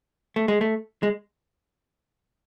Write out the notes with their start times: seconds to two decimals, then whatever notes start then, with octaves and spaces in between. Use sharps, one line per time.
0.36 A3
0.48 G#3
0.61 A3
1.03 G#3